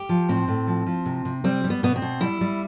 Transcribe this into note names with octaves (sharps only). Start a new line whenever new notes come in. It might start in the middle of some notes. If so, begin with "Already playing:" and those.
Already playing: G4
F3
A2 C4
A2
F3
F3
C3
C3
G3 C4
G3
B3
B2 B3
C4
B2
G3 E4
G3